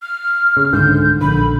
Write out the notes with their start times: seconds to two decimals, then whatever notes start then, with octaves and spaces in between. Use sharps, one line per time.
0.02 F6
0.57 C#3
0.73 C#2 G#2 D3 G6
1.21 A#1 D3 B5